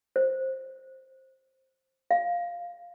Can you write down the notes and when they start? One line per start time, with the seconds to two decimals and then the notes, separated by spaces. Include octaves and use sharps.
0.16 C5
2.11 F5